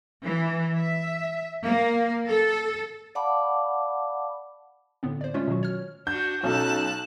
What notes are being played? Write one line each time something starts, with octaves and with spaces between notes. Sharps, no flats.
E3
E5
A#3
A4
D5 F5 F#5 A5 B5 D6
A2 D3 B3 C4
C5 D5
G#3 A3 C#4 F4 C#5
B2 D#3 F#3 F#4
C#5 F6
D4 F#4 G6
B1 C#4 D#4 A4 A5 F#6